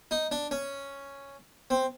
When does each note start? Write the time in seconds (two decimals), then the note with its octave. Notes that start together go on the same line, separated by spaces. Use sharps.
0.11 D#4
0.31 D4
0.51 C#4
1.70 C4